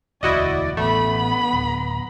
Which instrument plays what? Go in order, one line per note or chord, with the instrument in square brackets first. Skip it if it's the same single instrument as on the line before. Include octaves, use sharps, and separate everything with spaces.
[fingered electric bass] E1 D2 [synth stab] E4 F#4 D#5 [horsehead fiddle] D5
[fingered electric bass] A1 [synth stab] A3 [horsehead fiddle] B3 B5
[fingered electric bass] D1